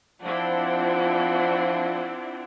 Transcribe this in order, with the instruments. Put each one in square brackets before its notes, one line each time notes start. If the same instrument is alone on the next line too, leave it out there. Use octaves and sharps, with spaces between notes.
[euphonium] F3 [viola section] C4 D4 E4 [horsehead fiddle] F4 F#5